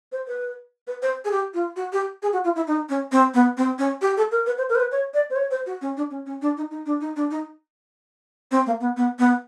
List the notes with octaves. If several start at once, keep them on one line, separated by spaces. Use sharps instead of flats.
C5
B4
B4
C5
G#4
G4
F4
F#4
G4
G#4
F#4
F4
E4
D#4
C#4
C4
B3
C4
C#4
G4
A4
A#4
B4
C5
A#4
C5
B4
C#5
D5
C5
C#5
C5
F#4
C#4
D4
C#4
C#4
D4
D#4
D#4
D4
D#4
D4
D#4
C4
A#3
B3
B3
B3